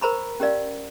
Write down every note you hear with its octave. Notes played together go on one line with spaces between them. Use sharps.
A#4 C5 A#5 B5 C#6
C#4 G4 A#4 D5 F5